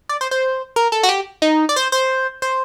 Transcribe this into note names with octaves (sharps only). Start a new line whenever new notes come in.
D5
C5
C5
A#4
A4
F#4
G4
D#4
D5
C5
C5
C5